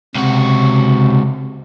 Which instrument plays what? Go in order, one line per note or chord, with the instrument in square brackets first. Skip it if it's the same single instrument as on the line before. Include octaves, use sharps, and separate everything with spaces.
[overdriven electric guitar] C#2 F#4 [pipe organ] C3